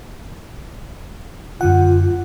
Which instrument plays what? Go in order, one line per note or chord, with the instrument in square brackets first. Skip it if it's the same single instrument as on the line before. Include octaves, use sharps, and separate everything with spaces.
[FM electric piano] F#2 D3 F#5 [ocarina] F4